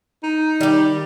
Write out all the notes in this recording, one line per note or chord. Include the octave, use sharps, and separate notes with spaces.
D#4
D#3 G3 G4